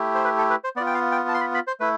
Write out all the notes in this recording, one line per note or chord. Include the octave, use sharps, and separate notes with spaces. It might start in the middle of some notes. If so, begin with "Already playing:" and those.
Already playing: A3 E4 G4
C5
B4
A4
B4
C5
B3 F4 D5
G5
F5
G5
A5
C6
B5
B5
C5
A3 E4 B4